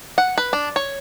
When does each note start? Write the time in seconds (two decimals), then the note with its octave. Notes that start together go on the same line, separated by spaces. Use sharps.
0.18 F#5
0.38 B4
0.53 D4
0.76 C#5